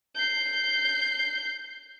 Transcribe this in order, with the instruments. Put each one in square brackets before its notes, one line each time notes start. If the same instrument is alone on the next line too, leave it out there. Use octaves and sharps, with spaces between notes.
[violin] G6 C7